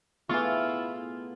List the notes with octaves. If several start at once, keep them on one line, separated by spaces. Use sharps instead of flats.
E3 A3 B3 E4 F4 G#4 C#6